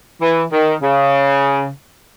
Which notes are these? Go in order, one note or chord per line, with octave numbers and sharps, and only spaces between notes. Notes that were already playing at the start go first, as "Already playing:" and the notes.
E3
D#3
C#3